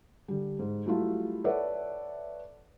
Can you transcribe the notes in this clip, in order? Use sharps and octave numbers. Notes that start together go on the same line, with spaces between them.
D3 G3
G#2
F#3 G3 A3 E4 F4
A4 B4 C#5 D5 E5 F#5